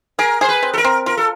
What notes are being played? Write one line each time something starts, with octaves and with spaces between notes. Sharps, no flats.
G#4 A#4
G#4 C5
B4
C4
A4
A#4
C4
F4 A#4
A4